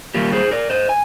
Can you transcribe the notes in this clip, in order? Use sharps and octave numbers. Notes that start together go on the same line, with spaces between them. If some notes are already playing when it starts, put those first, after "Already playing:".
D#3 G3 A#3 F4 G4 A#4
G#4 C5
A#4 D5
C5 D#5
G#5